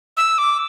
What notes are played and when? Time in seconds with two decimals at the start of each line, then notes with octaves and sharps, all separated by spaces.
0.17 E6
0.38 D6